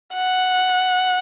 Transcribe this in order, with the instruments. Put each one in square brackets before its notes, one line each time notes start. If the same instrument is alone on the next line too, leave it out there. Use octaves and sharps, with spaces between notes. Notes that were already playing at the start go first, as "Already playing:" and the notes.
[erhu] F#5